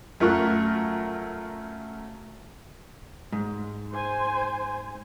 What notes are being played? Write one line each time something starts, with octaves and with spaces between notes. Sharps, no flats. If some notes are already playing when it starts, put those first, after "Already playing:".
F#2 A3 F4 A#4 C#6 F#6
G#2
C5 G#5